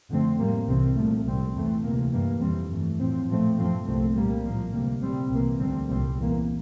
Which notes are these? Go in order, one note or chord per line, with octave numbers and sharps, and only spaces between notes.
F2 D3 A3 C4
A2 G3 A#3
C2 C3 E3 G3 C4
C2 A#2 F3 A3
C2 A#2 G3 C4
E2 E3 A3 C4
D2 C3 E3 A#3
G2 E3 G3 A#3
F2 E3 G3 C4
G2 E3 A3
A2 F3 C4
A#2 F3 A3 C4
G2 F3 A3 C4
C2 A#2 A3 C4
A#2 G3 A#3
A2 F3 A#3
D2 C3 G3 A#3
C2 A#2 G3 C4
C2 C3 E3 A#3
D2 D3 G3 C4
C2 A#2 G3 C4
E2 E3 A#3